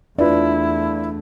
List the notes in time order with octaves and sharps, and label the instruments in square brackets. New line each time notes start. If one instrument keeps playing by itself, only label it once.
[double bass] E2 A3 [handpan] D4 [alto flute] E4 [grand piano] F4 B4 D5